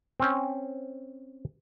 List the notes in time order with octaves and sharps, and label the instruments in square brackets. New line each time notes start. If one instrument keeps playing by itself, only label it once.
[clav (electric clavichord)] C4 C#4